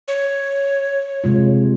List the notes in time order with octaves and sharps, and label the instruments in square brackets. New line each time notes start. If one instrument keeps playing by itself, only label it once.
[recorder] C#5
[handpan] C3 G#3 F4